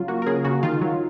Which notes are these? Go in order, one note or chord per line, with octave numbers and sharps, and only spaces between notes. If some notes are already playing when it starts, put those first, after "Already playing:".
Already playing: C#3 F#3 F4
A#3 F#4
A#4
C#3 G#4
C#3 F#4
D#3 F4
F#3